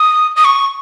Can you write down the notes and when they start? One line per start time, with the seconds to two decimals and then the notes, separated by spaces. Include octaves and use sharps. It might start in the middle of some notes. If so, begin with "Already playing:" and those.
Already playing: D#6
0.36 D#6
0.45 C#6